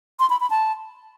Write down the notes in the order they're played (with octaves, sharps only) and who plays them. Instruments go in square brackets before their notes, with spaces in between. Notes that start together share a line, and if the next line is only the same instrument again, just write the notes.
[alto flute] C6
B5
B5
A5